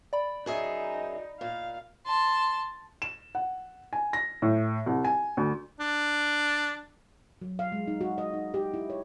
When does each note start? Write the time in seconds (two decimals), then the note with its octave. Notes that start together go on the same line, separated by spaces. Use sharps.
0.13 D5 B5
0.46 F#2 D#4 G#4 E5
1.41 A#2 F5
2.05 A5 C6
3.02 E7
3.35 F#5
3.93 G#5
4.13 A#6
4.42 A2
4.86 C2
5.05 G#5
5.37 D2
5.80 D4
7.42 F#3
7.59 F5
7.72 G#3
7.87 D#4
8.01 F#4
8.18 D#5
8.34 D#4
8.54 G4
8.74 E4
8.90 C#5